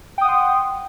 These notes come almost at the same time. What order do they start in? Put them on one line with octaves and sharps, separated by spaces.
G5 D#6 F#5 C6